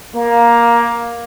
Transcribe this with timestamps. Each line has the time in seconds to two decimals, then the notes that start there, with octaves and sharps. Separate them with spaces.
0.15 A#3